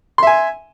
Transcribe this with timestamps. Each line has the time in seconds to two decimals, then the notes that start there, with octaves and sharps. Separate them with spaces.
0.18 C6
0.23 E5
0.27 G#5